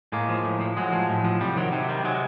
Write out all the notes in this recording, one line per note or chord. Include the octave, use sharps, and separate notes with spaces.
A2 G#3 A#3
F3
A2
F3
A2 F#3 G#3
F3
A2
F3
C3 G3
D#3 F#3
C3 F#3
D#3 G3
C3 F#3 G#3